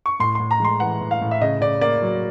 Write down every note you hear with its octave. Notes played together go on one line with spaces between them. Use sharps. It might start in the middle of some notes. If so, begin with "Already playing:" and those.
C#6
A2 C6
A2 C6
A#5
G#3 C6
E3 F#5
A2
F5
A2
E5
C#3 D#5
C#3 D5
A#3 D5
F#3